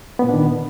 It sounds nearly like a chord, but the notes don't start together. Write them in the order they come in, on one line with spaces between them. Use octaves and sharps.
B3 A#2 D4 D#3